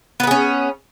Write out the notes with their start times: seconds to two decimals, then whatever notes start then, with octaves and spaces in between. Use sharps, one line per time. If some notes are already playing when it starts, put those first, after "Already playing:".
0.20 B3
0.23 B4
0.27 G#4
0.31 C#4